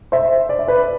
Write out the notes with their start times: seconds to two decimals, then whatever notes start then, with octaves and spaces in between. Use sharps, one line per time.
0.12 C5 E5
0.49 D5
0.59 E5
0.68 B4 D5